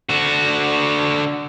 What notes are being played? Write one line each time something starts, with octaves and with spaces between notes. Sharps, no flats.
D3 F#4